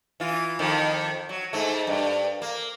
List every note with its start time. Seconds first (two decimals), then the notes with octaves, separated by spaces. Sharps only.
0.20 E3 F4
0.59 F2 D#3
1.29 F#3
1.53 G#2 A3
1.87 G2
2.42 A#3